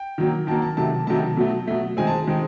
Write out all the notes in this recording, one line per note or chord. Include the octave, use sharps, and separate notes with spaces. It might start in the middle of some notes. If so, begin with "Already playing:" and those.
Already playing: G5
D#3 F#3 A#3
D#3 F#3 A#3 A5
A5
C3 D#3 F#3 A3 A5
C3 D#3 F#3 A3 A5
B2 F#3 A3
B2 F#3 A3
D#3 G#3 C4 G#5
A5
D#3 G#3 C4